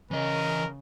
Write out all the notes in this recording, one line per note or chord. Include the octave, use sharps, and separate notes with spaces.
C#3 E3 A#4 D#5